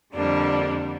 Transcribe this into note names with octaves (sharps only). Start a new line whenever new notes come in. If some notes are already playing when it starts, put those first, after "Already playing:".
F2 D3 G3 A#3 D4